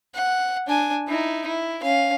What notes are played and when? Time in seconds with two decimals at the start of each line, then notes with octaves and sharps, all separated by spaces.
0.15 F#5
0.67 D4 G#5
1.08 D#4 E4
1.46 E4
1.83 C#4 F5